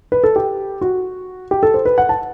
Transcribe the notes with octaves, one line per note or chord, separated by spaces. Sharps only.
B4
A4
G4
F#4
G4
A4
C5
B4
F#5
A5